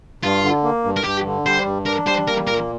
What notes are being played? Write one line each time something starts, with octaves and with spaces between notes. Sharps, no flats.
G2 F4
D3
A#3
G2
A#4
G2 G4
D3
G3 C5
G2
D4 A#4
G3 C5
A#3 A#4
A#2 A#4